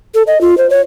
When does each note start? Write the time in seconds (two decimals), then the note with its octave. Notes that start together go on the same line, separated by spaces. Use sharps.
0.15 A4
0.27 D#5
0.41 F4
0.58 C5
0.70 C#5